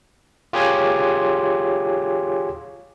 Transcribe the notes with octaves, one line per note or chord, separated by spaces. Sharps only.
F4 G4 G#4 C#5 G#5 C6